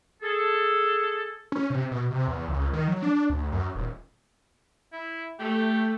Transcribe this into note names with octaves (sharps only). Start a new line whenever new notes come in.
G#4 A4
C#4
C3
B2
C3
E2
C#2
D#3
F#3
D4
D2
F#2
D#1
E4
A3 G4